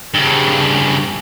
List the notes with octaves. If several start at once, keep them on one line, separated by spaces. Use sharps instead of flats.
G2 C#3